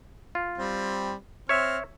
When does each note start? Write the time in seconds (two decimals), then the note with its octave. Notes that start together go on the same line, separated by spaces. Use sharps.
0.35 F4
0.58 G3 C4
1.49 C4 C#5 E5 F6